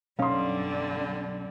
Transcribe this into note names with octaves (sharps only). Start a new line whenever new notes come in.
B1 F#2 D3 G3 C#4 F5 C6